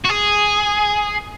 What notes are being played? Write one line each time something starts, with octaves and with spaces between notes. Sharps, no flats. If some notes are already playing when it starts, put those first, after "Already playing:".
F#4
G#4